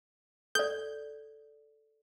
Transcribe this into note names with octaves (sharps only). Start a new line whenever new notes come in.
A4 D5 G6